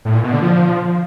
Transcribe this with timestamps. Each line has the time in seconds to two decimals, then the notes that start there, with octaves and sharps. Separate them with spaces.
0.05 A2
0.14 A#2
0.23 B2
0.32 D3
0.42 F3